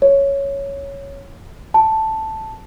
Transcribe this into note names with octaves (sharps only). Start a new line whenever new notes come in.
C#5
A5